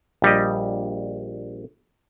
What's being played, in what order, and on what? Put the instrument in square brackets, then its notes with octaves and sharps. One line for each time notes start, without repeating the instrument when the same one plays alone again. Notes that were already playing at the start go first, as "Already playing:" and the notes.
[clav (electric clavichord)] A#1 G3 G4 D#5